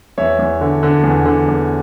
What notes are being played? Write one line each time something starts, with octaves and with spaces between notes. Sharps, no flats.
E2 C#5 E5
E2
D3
D3
E2
D3
E2